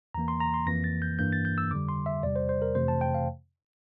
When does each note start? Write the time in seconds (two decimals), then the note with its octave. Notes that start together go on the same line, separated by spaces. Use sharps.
0.14 E2 E3 A#3 A#5
0.28 C6
0.41 A#5
0.54 C6
0.67 F2 E3 A#3 A#6
0.84 A6
1.02 G6
1.19 G2 E3 A#3 D4 G6
1.33 A6
1.45 G6
1.58 E6
1.71 F2 D3 G3 D6
1.89 C6
2.06 E5
2.23 E2 C3 G3 D5
2.36 C5
2.49 C5
2.62 A#4
2.75 F2 C3 E3 A3 C5
2.88 A5
3.01 G5
3.14 F5